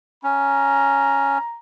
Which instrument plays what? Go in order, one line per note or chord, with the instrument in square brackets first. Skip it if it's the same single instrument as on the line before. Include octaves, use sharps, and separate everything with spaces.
[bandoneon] C#4 [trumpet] A#5